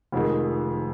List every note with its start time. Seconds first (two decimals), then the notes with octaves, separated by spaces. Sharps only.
0.12 F1 F2 D#3 G#3